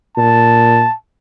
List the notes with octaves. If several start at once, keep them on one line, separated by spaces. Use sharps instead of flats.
A#2 A5